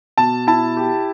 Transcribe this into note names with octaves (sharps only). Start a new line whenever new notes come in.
B2 A5
E4 A5
G4